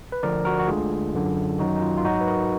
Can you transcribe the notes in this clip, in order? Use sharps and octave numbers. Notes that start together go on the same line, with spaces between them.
B4
D2 D3 F3 A#4 D5
F#4 A#4
F#4
D2 D3 G#3 F4 G#4
F#2 D3 F#3
F#2 D#3 F#3 D#4 F#4
D#4
F4
F4
G#2 F#3 D#4 F#4
B4
F#4 A#4